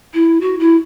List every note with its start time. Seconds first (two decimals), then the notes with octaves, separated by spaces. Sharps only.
0.14 E4
0.41 F#4
0.59 E4